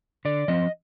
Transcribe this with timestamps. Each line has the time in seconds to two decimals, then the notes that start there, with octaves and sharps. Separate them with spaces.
0.25 D3 D5
0.48 F3 C4 D#5